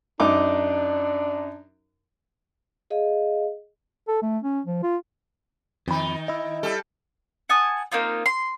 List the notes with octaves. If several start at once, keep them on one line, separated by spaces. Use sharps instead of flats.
F#2 D4 D#4 D6
G#4 D#5 F5
A4
A3
C#4
F3
F4
F2 D#3 D#4 B5
E4 D#5
G3 A4
F#5 G#5 A5 D#6
A#3 C4 D#4 F4
C6